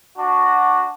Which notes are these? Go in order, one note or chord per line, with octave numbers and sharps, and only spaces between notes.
D4 F#4